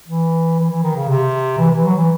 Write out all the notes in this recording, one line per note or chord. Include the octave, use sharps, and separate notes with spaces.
E3
E3
E3
D#3
C#3
C3
E3
E3
F#3
E3